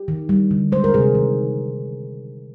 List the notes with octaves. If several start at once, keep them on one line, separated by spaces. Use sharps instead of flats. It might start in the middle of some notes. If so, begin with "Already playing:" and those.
Already playing: G4
D#3
G3
D3
G#3 C5
A#4
C3 G#4
D#3